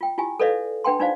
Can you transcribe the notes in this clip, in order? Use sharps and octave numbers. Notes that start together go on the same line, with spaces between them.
F4 G5
E4 F4 G4 G#5
A4 B4 C#5 D5 E5 F5
D4 B4 F#5 G5 A5 C6
D4 D#4 F4 C5 D5 F5